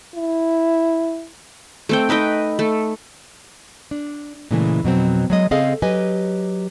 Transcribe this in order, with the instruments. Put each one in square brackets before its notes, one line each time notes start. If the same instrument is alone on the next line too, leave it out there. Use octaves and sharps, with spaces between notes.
[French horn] E4
[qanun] A3 C4 G5
D#4 B4 D#5 G5
A3
[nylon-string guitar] D4
A#2 C#3 E3 G#3 A3
F2 B2 F#3 C4
F#3 G#3 D#5
C#3 C4 G#4 A4 D#5 F5
F#3 G4 B4 D#5 G#5